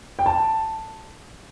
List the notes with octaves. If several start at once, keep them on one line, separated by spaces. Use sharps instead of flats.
G5
A5